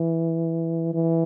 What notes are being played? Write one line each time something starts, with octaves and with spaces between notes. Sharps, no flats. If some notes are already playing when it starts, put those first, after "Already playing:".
Already playing: E3
E3